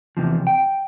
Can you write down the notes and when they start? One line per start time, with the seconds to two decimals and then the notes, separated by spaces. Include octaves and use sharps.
0.17 E2 C3 F3
0.47 G5